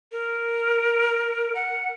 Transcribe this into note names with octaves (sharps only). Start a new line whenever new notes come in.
A#4
F#5